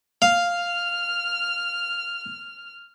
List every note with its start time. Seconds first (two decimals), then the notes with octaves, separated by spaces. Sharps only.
0.22 F5 F6